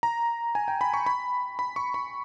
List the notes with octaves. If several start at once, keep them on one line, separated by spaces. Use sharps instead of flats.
A#5
G#5
G5
B5
C#6
B5
B5
C#6
B5